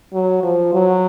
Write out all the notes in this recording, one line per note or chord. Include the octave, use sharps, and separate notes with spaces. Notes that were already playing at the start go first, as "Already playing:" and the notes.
F#3
F3
F#3